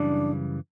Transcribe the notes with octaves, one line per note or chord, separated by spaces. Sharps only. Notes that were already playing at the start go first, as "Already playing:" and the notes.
Already playing: F#2 C#3 E3 G3 D4